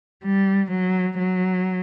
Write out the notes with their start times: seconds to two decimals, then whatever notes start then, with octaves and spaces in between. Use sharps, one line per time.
0.24 G3
0.71 F#3
1.18 F#3